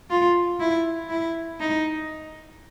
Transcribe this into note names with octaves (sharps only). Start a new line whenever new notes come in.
F4
E4
E4
D#4